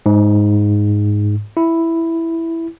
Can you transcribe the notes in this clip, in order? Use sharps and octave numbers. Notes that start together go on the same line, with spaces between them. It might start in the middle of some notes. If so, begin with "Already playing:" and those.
G#2
E4